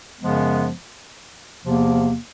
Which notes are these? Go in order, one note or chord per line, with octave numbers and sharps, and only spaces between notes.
F#2 C#3 F3 G#3 B3
E2 C3 F3 A#3